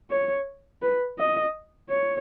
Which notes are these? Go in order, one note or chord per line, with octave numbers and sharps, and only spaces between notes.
C#5
B4
D#5
C#5